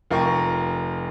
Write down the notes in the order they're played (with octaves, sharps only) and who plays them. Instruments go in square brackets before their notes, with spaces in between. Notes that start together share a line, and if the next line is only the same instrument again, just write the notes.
[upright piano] F1 F4 A#4 G5 C#6